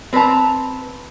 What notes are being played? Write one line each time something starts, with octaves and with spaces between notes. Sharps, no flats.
C4 B4 C5 A5 A#5